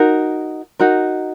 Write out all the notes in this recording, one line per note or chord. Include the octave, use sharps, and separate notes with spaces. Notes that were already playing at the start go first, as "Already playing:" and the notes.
Already playing: D#4 F#4 A#4
D#4 F#4 A#4